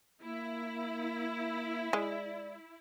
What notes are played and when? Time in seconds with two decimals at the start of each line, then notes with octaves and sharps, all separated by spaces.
0.23 A#3 E4
1.93 G#3 D5